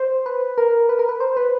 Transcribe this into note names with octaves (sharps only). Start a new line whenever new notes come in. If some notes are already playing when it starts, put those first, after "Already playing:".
Already playing: C5
B4
A#4
B4
A#4
B4
C5
B4